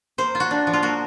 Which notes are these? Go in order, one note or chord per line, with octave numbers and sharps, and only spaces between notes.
A#3 C5
F4
F#4
D4
F3
F4
A#3 F#4